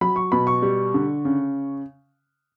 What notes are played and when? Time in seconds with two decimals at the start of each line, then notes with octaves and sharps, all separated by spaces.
0.01 F#3 B5
0.16 C#6
0.32 B2 B5
0.47 C#6
0.62 G3
0.94 D3
1.25 C#3